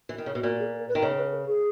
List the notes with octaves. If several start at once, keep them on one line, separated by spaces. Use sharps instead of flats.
E3
D#3
C#3
B2
A#2 F#4
G#4
A#4
B4
D#3
C#3 D#5
B4
A#4
G#4